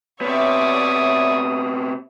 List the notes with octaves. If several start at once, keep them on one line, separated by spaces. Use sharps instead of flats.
C3 B3 C#5 D5 E5 D#6